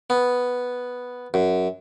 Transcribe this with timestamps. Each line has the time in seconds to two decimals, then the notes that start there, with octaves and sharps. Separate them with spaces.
0.10 B3
1.34 F#2